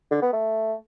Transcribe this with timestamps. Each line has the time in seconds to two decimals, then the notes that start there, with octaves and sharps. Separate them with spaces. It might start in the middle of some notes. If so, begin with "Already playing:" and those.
0.11 D3
0.22 B3
0.33 A3